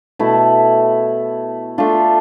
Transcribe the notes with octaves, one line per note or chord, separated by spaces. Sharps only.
B2 A3 E4
A3 D4 F4